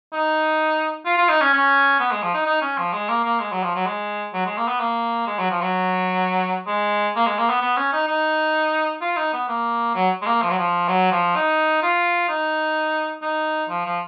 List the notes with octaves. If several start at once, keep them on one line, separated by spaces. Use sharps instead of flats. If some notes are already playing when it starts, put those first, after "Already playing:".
D#4
F4
F4
D#4
C#4
C#4
B3
G#3
F3
D#4
D#4
C#4
F3
G#3
A#3
A#3
G#3
F#3
F3
F#3
G#3
F#3
G#3
A#3
B3
A#3
G#3
F#3
F3
F#3
G#3
A#3
G#3
A#3
B3
B3
C#4
D#4
D#4
F4
D#4
B3
A#3
F#3
G#3
A#3
F3
F#3
F3
F#3
F3
D#4
F4
D#4
D#4
F3
F3